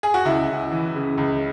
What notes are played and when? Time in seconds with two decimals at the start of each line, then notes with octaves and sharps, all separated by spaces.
0.03 G#4
0.14 F#4
0.25 C#2 E4
0.49 C#2
0.72 E3
0.95 C#3
1.18 C#2